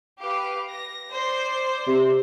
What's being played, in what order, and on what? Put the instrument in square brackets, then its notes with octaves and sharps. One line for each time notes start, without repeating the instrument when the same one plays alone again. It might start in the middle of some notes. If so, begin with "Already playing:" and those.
[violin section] G4 B4 F5
A#6
C5 D5
[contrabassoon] C3